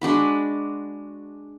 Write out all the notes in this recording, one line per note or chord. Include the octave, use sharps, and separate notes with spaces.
G#3 D4 F#4 B5